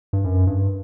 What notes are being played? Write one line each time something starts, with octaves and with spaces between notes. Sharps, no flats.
G2
F#2
G2